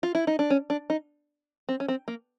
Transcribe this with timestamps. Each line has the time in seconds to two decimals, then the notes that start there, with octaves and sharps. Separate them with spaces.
0.03 F4
0.15 E4
0.27 D#4
0.39 D4
0.50 C#4
0.70 D4
0.90 D#4
1.69 C4
1.80 C#4
1.88 C4
2.08 A#3